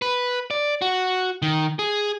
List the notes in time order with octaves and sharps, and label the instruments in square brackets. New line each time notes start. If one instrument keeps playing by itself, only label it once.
[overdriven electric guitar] B4
D5
F#4
D#3
G#4